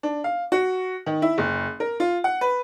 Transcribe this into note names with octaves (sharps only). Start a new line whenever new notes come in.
D4
F5
F#4
D#3
E4
F#1
A#4
F4
F#5
B4